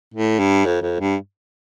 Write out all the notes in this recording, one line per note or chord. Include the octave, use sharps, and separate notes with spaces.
A2
G2
F2
F2
G2